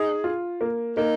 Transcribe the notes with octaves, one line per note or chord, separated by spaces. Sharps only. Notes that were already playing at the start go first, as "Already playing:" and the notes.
Already playing: D#4 G#4
F4
A#3
A#3 D#4